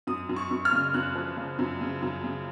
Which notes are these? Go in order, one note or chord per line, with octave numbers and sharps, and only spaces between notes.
F#2 D#6
F#2
C#6
F#2
F6
C#3
F#2 F#6
F3
C#3
F#2
C#3
F#2
C#3